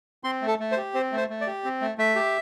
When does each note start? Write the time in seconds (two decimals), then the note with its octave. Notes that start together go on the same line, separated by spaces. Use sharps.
0.24 C4 C6
0.42 A3
0.47 A4
0.59 A3
0.72 C5
0.77 G4
0.94 C4 C5
1.12 A3 C5
1.30 A3
1.41 D5
1.47 G4
1.64 C4
1.81 A3
1.98 A3 E5
2.15 G4